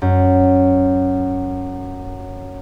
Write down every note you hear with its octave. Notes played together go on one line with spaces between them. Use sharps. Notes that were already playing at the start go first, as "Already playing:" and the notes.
F#2